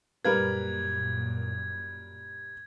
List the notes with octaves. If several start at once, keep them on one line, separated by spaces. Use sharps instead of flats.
F#2 A#2 G3 A#4 B4 G#6